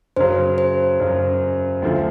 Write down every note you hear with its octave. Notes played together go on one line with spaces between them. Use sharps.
F#2 C#3 F#3 C5
C5
F#2 C#3 F#3
D2 D3 F3